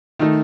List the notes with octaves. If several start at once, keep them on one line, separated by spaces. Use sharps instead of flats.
D#3 A3 D#4